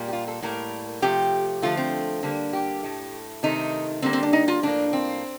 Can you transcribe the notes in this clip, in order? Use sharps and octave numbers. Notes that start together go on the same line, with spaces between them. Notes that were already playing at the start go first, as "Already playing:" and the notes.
Already playing: A#2 G3 A#3
G4
F4
A4
A2 G3 A#3 A#4
C3 F3 A3 G4
D3 F3 A3 F4
C4
D3 G3 A#3
G4
A2 A3
C3 D#3 A3 D#4
D3 G3 A#3 C4
C4
D4
D#4
F4
A2 F3 A#3 D4
C4